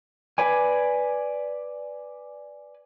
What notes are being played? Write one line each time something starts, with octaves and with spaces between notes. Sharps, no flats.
B4 D5 G#5